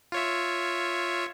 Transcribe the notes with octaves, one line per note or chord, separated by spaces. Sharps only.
F4 C#5 E5